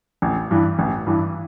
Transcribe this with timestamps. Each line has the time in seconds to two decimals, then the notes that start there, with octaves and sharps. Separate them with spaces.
0.22 A1
0.51 G2 E3
0.79 A1
1.06 G2 E3